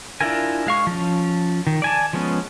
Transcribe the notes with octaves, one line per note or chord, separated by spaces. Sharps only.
D4 E4 F4 A#4 G#5
G#3 F5 C#6
F3 C#4
D#3
D5 G#5 A5
F3 G#3 B3 C#4